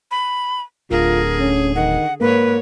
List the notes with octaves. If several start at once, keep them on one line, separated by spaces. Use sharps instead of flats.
B5
D1 D3 F4 G#4 A#4
C#4
D#3 F#5
G#2 A#3 A#4 B4 C#5